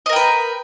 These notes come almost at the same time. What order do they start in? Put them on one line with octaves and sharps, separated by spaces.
D#5 A#4 G5 B4